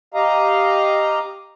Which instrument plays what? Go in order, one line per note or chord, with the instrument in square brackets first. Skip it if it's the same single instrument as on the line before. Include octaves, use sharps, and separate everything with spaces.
[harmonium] G4 D#5 F5 A#5